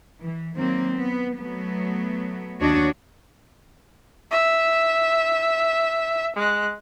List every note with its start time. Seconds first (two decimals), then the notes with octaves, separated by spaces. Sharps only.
0.22 E3
0.56 D#3 F#3 A#3 C4
0.96 B3
1.38 F#3 A3 B3
2.60 D#2 D4 F#4 C#5 D#5
4.31 E5
6.36 G#3 F#6